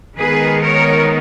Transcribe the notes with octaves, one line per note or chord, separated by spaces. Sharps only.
D#3 G#3 B3 D#4 G#4 B4
A#4 C#5